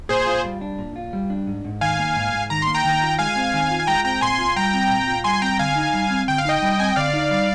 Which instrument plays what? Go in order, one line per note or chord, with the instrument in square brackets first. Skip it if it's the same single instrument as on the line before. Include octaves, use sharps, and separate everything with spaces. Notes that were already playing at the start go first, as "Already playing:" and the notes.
[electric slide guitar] A#2 [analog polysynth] G#4 C5
[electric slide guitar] F4
G3
D4
A#2
F4
G3
D4
G#2
G#2
[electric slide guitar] D#3 [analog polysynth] F5 G#5
[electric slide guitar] A#3
G#2
G#2
[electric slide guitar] D#3 [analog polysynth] A#5
[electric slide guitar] A#3 [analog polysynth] C6
[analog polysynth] G5 A#5
[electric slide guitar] D#3
F4
[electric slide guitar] G#3 [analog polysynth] F5 G#5
[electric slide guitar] C4
D#3
F4
[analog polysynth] G#5
[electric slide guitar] G#3 [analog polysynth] G5 A#5
[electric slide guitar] C4 [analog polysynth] G5 A#5
[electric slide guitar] A#2 [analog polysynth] G#5 C6
[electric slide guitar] F4
[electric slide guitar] G3 [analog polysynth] G5 A#5
[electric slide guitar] C4
A#2
F4
[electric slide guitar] G3 [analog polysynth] G#5 C6
[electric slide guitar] C4 [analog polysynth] G5 A#5
[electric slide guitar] D3 [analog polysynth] F5 G#5
[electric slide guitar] D#4
G3
C4
[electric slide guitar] D3 [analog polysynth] G5
[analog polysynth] F5
[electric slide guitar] D#4 [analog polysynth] D#5 G5
[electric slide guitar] G3
[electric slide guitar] C4 [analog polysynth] G#5
[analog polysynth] G5
[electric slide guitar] D3 [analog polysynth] D5 F5
[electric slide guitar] D#4
G3